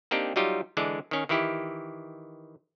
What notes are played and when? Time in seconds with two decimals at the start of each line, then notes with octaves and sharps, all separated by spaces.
0.11 A#3 C4 D4 D#4 G4
0.36 F#3 G3 D#4 F4 G4
0.77 D3 E3 G#3 D4
1.11 D#3 C#4
1.29 D#3 E3 E4 G4